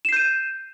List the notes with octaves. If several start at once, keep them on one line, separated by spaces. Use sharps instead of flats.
G6 C7 D#7 E7